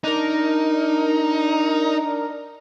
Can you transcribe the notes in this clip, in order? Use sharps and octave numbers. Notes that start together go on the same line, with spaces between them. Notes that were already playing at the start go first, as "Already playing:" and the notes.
D4 D#4 A#4